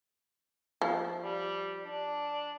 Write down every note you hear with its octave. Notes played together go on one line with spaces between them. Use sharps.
F3
G3
D4